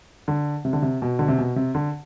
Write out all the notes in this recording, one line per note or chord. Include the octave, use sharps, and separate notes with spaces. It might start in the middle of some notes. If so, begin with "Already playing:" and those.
D3
C3
D3
C3
B2
D3
C3
B2
C3
D3